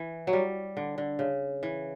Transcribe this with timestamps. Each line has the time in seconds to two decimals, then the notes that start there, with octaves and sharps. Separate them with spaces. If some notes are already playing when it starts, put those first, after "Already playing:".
Already playing: E3
0.27 F#3
0.33 G3
0.77 D3
0.98 D3
1.19 C#3
1.63 E3